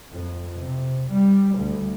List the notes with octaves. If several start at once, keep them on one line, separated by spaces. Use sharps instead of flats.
F2
C3
G3
D2